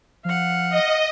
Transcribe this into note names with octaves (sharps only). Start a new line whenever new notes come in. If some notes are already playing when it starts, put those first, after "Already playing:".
F3 F5 F#5
D#5